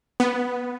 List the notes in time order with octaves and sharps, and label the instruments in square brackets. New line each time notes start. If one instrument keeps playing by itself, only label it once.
[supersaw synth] B3